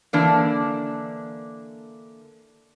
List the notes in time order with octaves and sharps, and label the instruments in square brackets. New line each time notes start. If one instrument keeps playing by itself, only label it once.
[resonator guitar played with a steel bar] D3 E3 A#3 D4